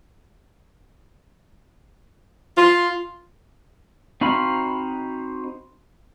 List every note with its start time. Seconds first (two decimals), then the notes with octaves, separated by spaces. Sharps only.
2.57 F4
4.21 C4 D#4 F#4 F5 B5